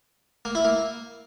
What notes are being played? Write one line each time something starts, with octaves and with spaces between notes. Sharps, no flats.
A#3
E4
A#3